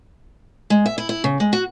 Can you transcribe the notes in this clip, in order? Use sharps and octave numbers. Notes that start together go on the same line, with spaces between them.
G#3
E5
E4
E4
C#3
G#3
F#4